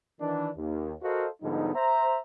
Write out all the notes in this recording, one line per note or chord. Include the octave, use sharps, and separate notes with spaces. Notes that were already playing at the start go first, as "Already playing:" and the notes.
D#3 E3 D4
D#2
F#4 A4 A#4 C5 D#5 F5
G#2 D3 F3 G3 B3 D#4
C5 E5 A#5